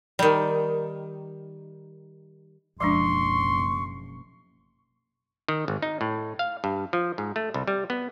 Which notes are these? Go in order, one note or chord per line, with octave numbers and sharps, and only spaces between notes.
D#3 G3
F#1 B1 F3 G#3 D4 C6 C#6
D#3
G#1
D#4
A2
F5
G2
F3
G#2
A3
C2
G3
B3